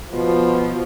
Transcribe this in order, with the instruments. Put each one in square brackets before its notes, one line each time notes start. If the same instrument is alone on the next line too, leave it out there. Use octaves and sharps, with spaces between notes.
[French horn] B2 [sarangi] F3